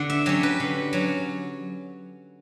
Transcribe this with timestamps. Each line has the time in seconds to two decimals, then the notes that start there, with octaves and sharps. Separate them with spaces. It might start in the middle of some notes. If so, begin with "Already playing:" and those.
Already playing: D3 F#5
0.10 E5
0.26 F#3 C#4 G4
0.43 B4
0.60 D3
0.93 F#3 C#4